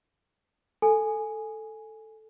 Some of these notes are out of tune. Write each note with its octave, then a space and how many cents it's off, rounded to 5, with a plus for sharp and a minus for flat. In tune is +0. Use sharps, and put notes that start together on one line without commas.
A4 +0 G#5 +0